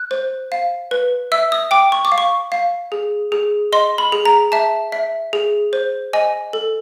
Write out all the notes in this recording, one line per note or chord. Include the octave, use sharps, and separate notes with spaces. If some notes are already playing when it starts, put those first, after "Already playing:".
Already playing: F#6
C5
F5
B4
E5 E6
D#6
G5 D6
C#6
D6
F5
C#6
F5
G#4
G#4
D#5 C6
B5
G#4
A#5
E5 A5
E5
G#4
C5
D#5 G#5
A4